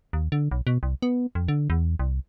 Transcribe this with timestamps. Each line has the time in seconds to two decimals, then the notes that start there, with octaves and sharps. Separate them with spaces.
0.13 D#2
0.32 D3
0.51 B1
0.67 B2
0.83 C2
1.02 B3
1.35 F2
1.48 D3
1.70 E2
1.99 C2